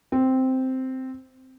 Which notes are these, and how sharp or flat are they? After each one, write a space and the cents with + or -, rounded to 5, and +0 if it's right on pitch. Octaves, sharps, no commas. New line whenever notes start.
C4 -5